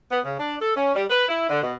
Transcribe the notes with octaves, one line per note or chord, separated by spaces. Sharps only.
B3
C#3
D4
A4
C#4
G3
B4
E4
D3
B2